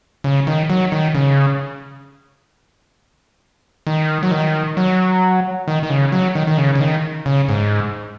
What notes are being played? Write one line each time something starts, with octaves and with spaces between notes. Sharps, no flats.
C#3
D#3
F#3
D#3
C#3
D#3
F#3
D#3
F#3
D#3
D#3
C#3
F#3
D#3
D#3
C#3
C#3
D#3
C#3
G#2